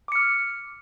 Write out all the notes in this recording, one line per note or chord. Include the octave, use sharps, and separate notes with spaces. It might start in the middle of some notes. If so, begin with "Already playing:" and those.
D6 F6 C#7